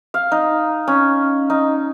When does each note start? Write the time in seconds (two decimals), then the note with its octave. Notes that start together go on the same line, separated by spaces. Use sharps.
0.14 F5
0.32 D#4
0.88 C#4
1.50 D#4